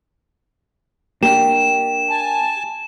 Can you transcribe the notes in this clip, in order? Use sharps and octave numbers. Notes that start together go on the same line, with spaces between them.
A#3 D4 G4 E7
G#5 A5